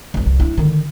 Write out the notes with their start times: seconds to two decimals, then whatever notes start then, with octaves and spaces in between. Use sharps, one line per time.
0.14 F1 C2
0.26 C2
0.40 D4 E4
0.58 D3 D#3